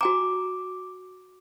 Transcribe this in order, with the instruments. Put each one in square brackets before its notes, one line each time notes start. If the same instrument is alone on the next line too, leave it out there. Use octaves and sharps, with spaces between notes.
[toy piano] F#4 G#5 A#5 [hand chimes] D6